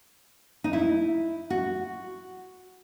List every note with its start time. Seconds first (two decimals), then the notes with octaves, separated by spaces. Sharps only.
0.64 D#4
0.73 E4
1.50 F#4